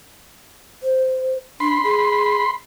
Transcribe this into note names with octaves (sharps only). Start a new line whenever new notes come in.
C5
D4 B5 C6
G#4